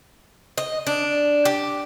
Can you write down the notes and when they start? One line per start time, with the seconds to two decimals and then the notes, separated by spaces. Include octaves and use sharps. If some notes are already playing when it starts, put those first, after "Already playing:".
0.58 D#5
0.87 D4
1.45 G4